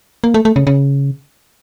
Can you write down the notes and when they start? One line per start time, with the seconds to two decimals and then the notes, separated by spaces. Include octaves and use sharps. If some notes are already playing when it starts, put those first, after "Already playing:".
0.24 A#3
0.34 A3
0.45 A3
0.56 C#3
0.67 C#3